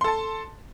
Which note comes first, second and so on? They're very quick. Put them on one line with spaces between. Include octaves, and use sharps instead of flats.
C6 A4 A5